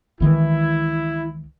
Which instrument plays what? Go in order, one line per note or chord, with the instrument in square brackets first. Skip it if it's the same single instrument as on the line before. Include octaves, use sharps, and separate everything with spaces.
[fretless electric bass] C#2 D#3 E3 [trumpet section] E4